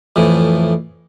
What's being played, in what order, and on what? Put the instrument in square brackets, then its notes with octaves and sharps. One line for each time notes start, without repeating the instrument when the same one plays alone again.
[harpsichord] F2 A2 E3